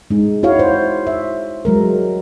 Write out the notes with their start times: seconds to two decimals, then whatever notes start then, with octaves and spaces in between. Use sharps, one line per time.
0.10 G#3 D#4
0.43 E4 F#4 C#5 F5
0.59 C5
1.07 E5
1.65 F#3 G#3 A#4